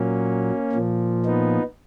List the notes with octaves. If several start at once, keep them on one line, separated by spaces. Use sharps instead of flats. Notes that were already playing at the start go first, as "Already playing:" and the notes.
Already playing: A#2 F#3 A#3 C#4
A#2 F3
B3 D#4